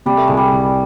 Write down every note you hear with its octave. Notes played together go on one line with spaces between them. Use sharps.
C3 G3
A3
C2 G#3
G3
C2